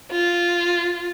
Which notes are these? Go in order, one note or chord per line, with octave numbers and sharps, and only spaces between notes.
F4